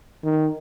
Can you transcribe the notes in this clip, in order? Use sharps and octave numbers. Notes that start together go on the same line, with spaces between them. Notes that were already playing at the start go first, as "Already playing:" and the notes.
D#3